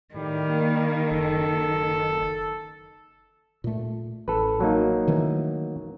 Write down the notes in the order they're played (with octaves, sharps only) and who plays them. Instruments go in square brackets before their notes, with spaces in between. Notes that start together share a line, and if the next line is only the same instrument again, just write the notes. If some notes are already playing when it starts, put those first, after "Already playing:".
[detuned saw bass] A2 [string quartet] D#3 [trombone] G3
[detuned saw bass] A#3
[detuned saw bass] F#1 [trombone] A4
[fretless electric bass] A#2 A3
[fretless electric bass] A1 [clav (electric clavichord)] A4 B4
[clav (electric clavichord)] F#3 A#3 D#4
[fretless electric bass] D#3 E3 A3